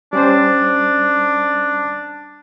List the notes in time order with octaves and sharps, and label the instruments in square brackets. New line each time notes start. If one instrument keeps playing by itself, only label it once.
[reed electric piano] G3 C#4 C5 [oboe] D4